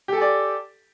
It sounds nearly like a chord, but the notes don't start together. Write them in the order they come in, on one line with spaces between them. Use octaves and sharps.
G4 A4 G#5 D5